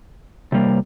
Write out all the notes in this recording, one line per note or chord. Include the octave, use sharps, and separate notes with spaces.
C3 G3 A#3